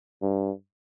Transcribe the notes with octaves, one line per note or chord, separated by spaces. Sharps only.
G2